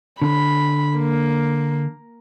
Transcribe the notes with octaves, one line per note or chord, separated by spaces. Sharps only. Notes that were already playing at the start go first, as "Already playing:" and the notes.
D3 B5
A#3